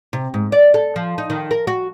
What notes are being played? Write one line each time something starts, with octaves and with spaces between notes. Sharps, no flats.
C3
G#2
D5
A4
F3
D#4
D#3
A#4
F#4